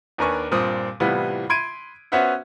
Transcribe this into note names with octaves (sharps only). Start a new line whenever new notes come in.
D#2 D4 A#4 B4 G#5 C#6
G2 A#2 C4 D#6
A2 C3 E3 G3 B3 F4
B5 C6 G#6 D7 D#7
B3 C#4 F#4 C5 E5 F#5